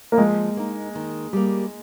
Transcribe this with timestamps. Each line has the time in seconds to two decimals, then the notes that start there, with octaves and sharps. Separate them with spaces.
0.12 A#3
0.18 F3 G#3
0.57 A#3 D#4
0.95 D#3
1.33 G3 A#3